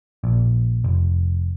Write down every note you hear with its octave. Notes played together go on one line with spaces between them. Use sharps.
A#1
F1